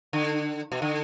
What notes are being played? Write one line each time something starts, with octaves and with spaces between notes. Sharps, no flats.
D3
B2
D3